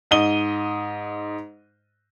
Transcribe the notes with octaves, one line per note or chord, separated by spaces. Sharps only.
G#2 D#5 D#7 G7